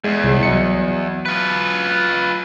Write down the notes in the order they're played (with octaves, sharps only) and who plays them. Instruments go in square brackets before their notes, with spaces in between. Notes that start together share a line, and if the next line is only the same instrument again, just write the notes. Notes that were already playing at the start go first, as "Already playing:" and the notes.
[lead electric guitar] E2 [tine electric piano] G#3
[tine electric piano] C2
F#3 D#5 C#7
[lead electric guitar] F4 B4